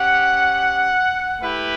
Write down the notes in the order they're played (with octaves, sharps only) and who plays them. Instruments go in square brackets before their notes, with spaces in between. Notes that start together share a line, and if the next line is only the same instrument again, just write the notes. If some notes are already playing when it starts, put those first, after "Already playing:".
Already playing: [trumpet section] C#4 G4 F#5
A3 E4 G4 B4